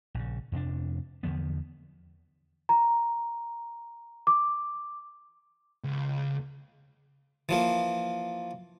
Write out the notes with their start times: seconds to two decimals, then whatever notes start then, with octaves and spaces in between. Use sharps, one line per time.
0.15 A#1 C#3
0.52 F2 C3 F3 D4
1.23 E2 D3 F3 B3
2.69 A#5
4.27 D6
5.84 C#2
7.49 E3 F3 A#3